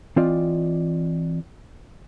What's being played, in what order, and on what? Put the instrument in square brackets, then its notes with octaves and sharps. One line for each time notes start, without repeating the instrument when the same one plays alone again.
[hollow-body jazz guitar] E3 C4 F4 D5 D#5